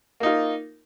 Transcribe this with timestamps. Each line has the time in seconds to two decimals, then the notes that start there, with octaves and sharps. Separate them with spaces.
0.20 A#3
0.23 D#4
0.26 F4